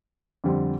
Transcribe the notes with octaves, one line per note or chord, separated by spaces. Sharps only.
F2 D3 G3 C4